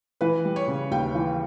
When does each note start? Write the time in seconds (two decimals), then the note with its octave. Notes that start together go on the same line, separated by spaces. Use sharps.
0.21 E3 B4
0.45 G3
0.56 C#5
0.68 C#3
0.91 D#2 G5
1.15 E3